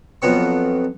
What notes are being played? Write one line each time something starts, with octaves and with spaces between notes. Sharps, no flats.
F2 F#3 B3 C#6